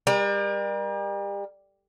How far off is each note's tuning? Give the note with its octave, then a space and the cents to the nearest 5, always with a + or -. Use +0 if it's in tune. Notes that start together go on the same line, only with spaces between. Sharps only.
G3 +35 A#4 +35